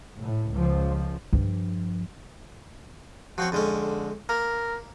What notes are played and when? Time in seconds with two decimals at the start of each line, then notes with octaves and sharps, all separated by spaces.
0.18 A2
0.53 C#2 F3
1.33 G2 F3
3.38 F3 C4 F#4 C#5
3.52 F2 D3 G#3 C#4
4.29 A#3 A#4